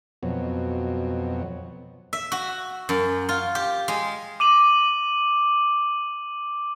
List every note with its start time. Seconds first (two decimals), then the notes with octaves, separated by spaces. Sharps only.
0.23 F2 B2 F#3
2.13 E5
2.32 F#4
2.89 F#2
3.29 F4
3.55 G4
3.88 G#3
4.40 D6 D#7 F#7